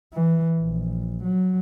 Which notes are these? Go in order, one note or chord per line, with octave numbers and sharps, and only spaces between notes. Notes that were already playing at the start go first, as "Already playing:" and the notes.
E3
A#1
F#3